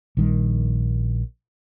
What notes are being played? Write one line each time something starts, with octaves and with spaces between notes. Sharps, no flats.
A#1 D#3 G3